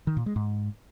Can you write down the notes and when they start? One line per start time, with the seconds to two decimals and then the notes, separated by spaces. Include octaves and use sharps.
0.07 D#3
0.17 A#2
0.26 G#3
0.36 G#2